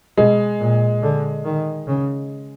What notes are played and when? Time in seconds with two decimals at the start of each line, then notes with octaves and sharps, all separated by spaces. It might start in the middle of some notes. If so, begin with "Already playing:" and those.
0.18 B2 G#3
0.60 A#2
1.03 D3
1.45 D#3
1.87 C#3